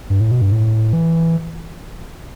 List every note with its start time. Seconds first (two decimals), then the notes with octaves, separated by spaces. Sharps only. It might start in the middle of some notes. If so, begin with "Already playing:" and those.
0.10 G2
0.21 A2
0.31 B2
0.42 G2
0.52 A2
0.93 E3